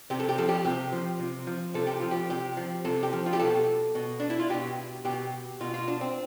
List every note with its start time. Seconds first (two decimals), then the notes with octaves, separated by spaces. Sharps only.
0.10 C3 G4
0.20 A4
0.29 G4
0.38 F3 A4
0.49 G4
0.65 C3 G4
0.93 F3
1.20 C3
1.47 F3
1.74 C3 A4
1.87 G4
2.00 F3 F4
2.11 G4
2.30 C3 G4
2.57 F3
2.85 C3 A4
3.03 G4
3.13 F3
3.26 F4
3.33 G4
3.39 B2 A4
3.95 B2
4.20 D4
4.30 E4
4.39 F4
4.50 B2 G4
5.05 B2 G4
5.60 B2 F4
5.74 F4
5.88 D4
6.01 C4